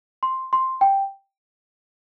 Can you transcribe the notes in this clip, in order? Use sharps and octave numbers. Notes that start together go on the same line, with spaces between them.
C6
C6
G5